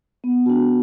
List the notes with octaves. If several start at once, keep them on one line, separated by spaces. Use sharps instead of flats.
B3
D4 F#4